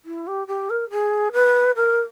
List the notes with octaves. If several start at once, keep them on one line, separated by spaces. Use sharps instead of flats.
E4
G4
G4
A#4
G#4
B4
A#4